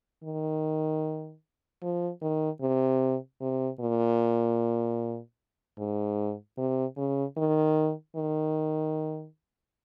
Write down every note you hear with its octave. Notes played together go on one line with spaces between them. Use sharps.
D#3
F3
D#3
C3
C3
A#2
G#2
C3
C#3
D#3
D#3